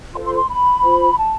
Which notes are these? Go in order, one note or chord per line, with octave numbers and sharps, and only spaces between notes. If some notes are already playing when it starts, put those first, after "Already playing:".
F4 A4 C5 C6
C6
B5
C6
B5
F4 C5
A5